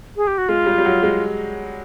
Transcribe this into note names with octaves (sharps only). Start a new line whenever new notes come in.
G#4
G4
F#4
G#3 F4
G3
G3
F#3
G#3